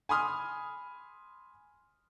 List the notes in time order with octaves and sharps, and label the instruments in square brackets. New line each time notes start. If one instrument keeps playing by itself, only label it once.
[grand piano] G#5 B5 C6 D#6 F6